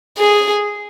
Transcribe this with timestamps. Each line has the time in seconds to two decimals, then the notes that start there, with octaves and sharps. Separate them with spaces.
0.18 G#4